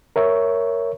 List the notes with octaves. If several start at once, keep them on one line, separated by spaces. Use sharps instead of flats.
A#4 C#5 E5